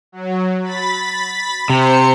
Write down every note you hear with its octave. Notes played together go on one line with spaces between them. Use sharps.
F#3
B5 A6 B6
C3 C5 C#7